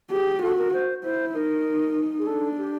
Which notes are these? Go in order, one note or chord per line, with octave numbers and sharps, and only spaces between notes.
G4 G#4
F#4 A4
A#4
C5
E4 C5
D#4 A#4
G#4
D4 A4
G4